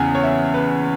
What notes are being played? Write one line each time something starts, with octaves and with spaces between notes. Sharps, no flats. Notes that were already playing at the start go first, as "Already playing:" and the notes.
Already playing: E2 C#3 G#5
C#5
E5
B4